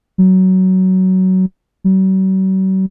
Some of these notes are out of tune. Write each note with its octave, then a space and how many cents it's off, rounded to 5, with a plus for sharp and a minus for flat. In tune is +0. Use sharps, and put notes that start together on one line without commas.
F#3 +15
F#3 +45